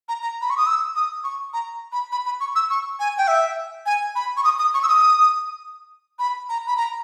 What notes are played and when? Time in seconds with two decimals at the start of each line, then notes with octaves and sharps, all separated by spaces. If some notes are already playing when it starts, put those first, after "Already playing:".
0.08 A#5
0.22 A#5
0.41 B5
0.50 C#6
0.57 D#6
0.66 E6
0.95 D#6
1.24 C#6
1.53 A#5
1.92 B5
2.12 B5
2.26 B5
2.40 C#6
2.55 E6
2.70 C#6
2.99 G#5
3.18 G5
3.28 E5
3.86 G#5
4.15 B5
4.37 C#6
4.44 D#6
4.59 D#6
4.74 C#6
4.83 E6
4.88 D#6
6.19 B5
6.49 A#5
6.67 B5
6.77 A#5